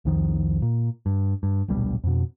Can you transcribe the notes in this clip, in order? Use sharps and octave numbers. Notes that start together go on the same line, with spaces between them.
C2 F2 D#3 F3
A#2
G2
G2
D1 A#1 B2 G3
F2 B2